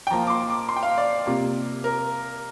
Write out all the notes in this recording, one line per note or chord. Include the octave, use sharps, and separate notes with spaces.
G5
F3 A#3 F4 A#5
D6
C6
D6
C6
G5
F5
D5
C3 G3 A#3 F4
A#4